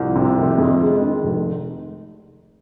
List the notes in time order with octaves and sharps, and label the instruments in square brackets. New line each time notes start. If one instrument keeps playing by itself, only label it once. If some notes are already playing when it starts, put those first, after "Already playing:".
Already playing: [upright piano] C2 F3
C3
F1
F2
G#3
D#3
F1